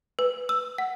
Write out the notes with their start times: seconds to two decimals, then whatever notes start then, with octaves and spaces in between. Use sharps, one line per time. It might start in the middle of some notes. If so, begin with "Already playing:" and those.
0.19 B4
0.49 E6
0.78 F#5